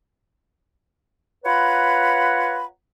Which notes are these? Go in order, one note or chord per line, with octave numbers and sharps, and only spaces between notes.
F4 B4 C#5 F#5 A#5 B5